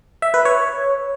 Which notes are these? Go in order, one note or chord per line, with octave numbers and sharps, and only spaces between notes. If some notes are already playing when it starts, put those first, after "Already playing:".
E5
B4
C#5